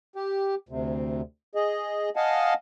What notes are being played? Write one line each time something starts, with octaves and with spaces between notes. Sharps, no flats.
G4
D2 C3
G#4 D#5
D#5 F5 F#5 G#5 A5